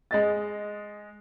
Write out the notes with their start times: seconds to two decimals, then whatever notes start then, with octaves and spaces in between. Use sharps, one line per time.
0.11 G#3 D#5 A6